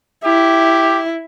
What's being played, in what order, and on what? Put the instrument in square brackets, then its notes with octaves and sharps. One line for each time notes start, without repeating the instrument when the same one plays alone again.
[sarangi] E4 [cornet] G4